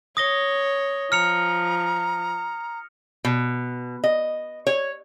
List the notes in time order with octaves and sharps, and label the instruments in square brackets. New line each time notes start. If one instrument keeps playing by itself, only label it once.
[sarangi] C#5 [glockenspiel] D#6 A#6 G7
[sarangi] F3 [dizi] A#5 [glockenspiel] F6 C#7 F7
[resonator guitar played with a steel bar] B2
D#5
C#5